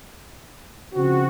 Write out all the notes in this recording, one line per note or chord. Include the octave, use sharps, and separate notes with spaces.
C#3 F3 C4 F#4